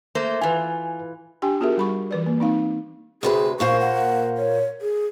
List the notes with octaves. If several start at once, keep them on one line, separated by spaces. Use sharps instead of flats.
A3 A#3 C5
E3 F4 B4 G#5
D4 G4 G5 G#5
B3 F4 F#4 G#4 A#4 E5
G3 B5 C#6
E3 B4 D5
A#3
C4 D#4 F5
D2 C3 G#4 B4
A#2 A#3 C5 C#6
F#5
C#5
G#4